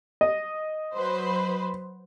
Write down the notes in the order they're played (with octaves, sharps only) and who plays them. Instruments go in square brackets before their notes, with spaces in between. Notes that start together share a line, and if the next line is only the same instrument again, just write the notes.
[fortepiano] D#5
[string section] F#3 B4 C5